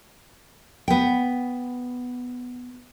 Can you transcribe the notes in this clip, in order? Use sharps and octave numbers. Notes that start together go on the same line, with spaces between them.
B3 G5